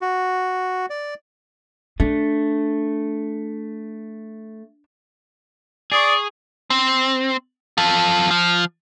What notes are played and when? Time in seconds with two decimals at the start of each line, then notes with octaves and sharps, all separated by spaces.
0.02 F#4
0.90 D5
2.00 A3 D4
5.92 G#4 D5 C#6 D#6 C7
6.70 C4
7.78 F4 A4
8.31 F3